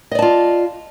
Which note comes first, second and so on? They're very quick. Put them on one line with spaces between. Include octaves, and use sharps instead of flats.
D#5 D5 A5 F4